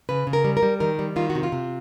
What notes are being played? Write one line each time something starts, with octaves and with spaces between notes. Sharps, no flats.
C#3 B4
C#3
A#4
G3
A#4
G3
D#3 A#4
G3
D#3 F4
F#4
C3
F4
C3